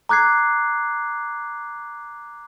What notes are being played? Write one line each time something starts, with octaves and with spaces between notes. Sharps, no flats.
A#5 D6 F#6 G#6 C7